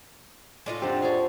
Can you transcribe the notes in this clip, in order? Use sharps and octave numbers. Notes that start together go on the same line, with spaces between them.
A2 G#3 D#4 F4 D5
F2 C4 D4 G4 F#5
F3 G#4 C#5 D5